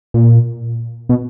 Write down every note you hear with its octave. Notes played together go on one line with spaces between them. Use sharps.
A#2
B2